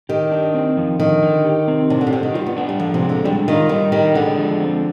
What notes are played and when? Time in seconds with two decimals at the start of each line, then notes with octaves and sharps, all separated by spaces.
0.09 D#3 G4
0.31 D4
0.54 C4
0.77 F3
0.99 D3 D#3
1.23 D3
1.45 G4
1.68 C4
1.90 C3 D4
2.01 D3
2.07 C3
2.12 D3 G4
2.23 D#3
2.34 G3 F4
2.47 B3
2.57 B3 D4
2.69 G3
2.80 D3 F3
2.94 C3
3.02 G#3
3.09 D3
3.25 G3 D4
3.48 D#3 F4
3.69 D#3 G3
3.92 D#3 G4
4.14 D3 G#3
4.37 F3
4.60 C4